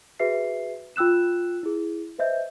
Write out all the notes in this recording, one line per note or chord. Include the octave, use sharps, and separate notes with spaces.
F#4 G#4 B4 E5 C7
F4 G5 E6 F#6 E7
E4 G#4
B4 C5 D#5 E5 G6